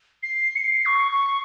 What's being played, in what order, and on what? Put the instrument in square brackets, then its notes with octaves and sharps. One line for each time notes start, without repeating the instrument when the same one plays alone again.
[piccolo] C7
C#7
C7
C#6
C#6